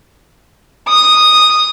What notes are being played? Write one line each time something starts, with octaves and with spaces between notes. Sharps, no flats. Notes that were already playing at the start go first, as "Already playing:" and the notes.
D#6